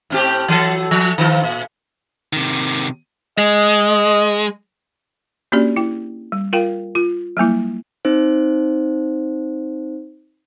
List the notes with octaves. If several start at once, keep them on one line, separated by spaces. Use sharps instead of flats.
A2 C4 G4
E3 F#3 A4
F3
D#3 F3 F4
A#2
C3 D#3
G#3 D#5
A#3 C#4 D4 F#4 G4 D5
E4 G5
G3
F4 A#4 F5 G5
F4
F#3 G3 A#3 E4
C4 D#4 C5